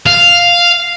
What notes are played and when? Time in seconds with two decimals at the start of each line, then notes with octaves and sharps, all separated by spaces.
0.06 F5